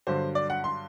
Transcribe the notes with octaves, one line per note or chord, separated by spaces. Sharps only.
G2 D3 F#3 C5
D5
F#5
C6